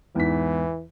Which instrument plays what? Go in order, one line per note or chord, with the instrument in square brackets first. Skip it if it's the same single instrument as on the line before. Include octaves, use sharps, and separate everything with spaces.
[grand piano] E2 G#2 B6 [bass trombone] E3